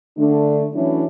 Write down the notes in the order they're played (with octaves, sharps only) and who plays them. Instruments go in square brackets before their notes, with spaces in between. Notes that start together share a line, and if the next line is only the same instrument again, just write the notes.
[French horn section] D3 A3 D4
E3 F#3 A3 C#4 D4 E4